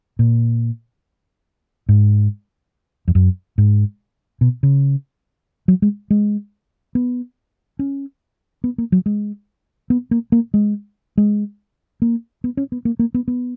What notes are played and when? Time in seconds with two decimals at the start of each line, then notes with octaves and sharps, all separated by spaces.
0.19 A#2
1.89 G#2
3.08 F2
3.15 F#2
3.58 G#2
4.41 B2
4.63 C#3
5.68 F#3
5.82 G#3
6.10 G#3
6.95 B3
7.79 C#4
8.64 B3
8.78 A#3
8.92 F#3
9.06 G#3
9.90 B3
10.11 A#3
10.32 A#3
10.54 G#3
11.17 G#3
12.02 A#3
12.44 B3
12.57 C#4
12.72 B3
12.85 A#3
12.99 A#3
13.14 B3
13.28 B3